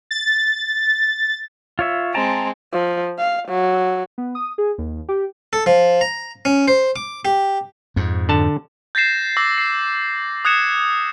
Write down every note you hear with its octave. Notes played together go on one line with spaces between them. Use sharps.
A6
F4 C#5 E5
G#3 C4 G5 A5 A#5
F3
F5
F#3
B3
D#6
G#4
D#2
G4
A4
F3
A#5
C#4
C5
D6
G4
F2 G#2
D3 A5
G6 A6 A#6 C7 E7
D6 E6 A#6
C7
D#6 F#6 G#6 C#7 E7